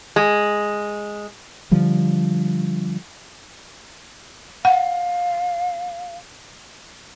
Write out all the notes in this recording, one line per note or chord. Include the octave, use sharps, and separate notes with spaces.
G#3
D3 F3 G3
F5 F#5